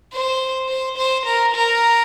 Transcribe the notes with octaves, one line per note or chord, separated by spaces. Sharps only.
C5
C5
C5
A#4
A#4